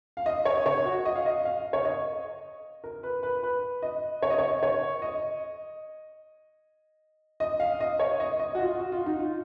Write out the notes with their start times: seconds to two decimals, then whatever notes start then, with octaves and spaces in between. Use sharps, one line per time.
0.17 F5
0.26 D#5
0.45 C#5
0.66 C#5
0.85 F#4
1.05 D#5
1.15 F5
1.26 D#5
1.45 F5
1.73 C#5
1.85 D#5
2.84 A#4
3.03 B4
3.23 B4
3.43 B4
3.82 D#5
4.22 C#5
4.30 D#5
4.38 C#5
4.56 D#5
4.63 C#5
5.02 D#5
7.40 D#5
7.60 F5
7.80 D#5
7.99 C#5
8.20 D#5
8.40 D#5
8.55 F#4
8.59 F4
8.79 F#4
8.92 F4
9.06 D#4
9.19 F4